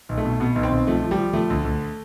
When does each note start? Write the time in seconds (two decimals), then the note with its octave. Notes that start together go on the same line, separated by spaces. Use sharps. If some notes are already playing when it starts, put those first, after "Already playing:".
0.09 B1
0.18 A3
0.25 B2
0.40 B2 B3
0.56 B1
0.63 C4
0.71 B1
0.87 F3 A3
1.02 F3
1.11 G3
1.18 F3
1.33 F3 A3
1.50 D2
1.65 D2